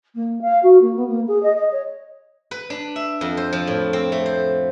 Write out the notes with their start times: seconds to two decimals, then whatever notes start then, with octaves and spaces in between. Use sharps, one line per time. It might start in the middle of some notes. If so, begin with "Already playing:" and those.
0.15 A#3
0.41 F5
0.63 F#4
0.81 A#3
0.96 B3
1.08 A#3
1.27 G#4
1.43 D#5
1.57 D#5
1.72 C#5
2.51 B4
2.70 D4
2.96 E5
3.21 F2
3.37 C5
3.53 F3
3.67 A2
3.93 C4
4.12 A3
4.26 C5